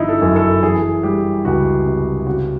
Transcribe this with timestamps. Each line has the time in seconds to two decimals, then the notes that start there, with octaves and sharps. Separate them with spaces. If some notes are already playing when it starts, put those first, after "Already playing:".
Already playing: G1 F3 D#4 E4
0.09 A4
0.22 F#2
0.36 A4
0.63 E3 G#4
1.03 G3 G4
1.45 C#2 F#4
1.86 C3
2.27 C#3 F#4